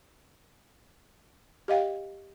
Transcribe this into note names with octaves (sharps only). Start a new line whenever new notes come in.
G4 D#5 F5 G5